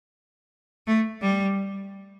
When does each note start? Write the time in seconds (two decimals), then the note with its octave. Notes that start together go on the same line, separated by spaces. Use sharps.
0.87 A3
1.21 G3